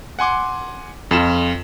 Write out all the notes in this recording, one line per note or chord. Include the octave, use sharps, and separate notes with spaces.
F#5 G#5 C6 D6
F2 F4 E7